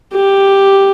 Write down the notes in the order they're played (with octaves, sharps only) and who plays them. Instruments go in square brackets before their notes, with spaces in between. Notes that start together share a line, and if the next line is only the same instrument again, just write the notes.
[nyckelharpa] G4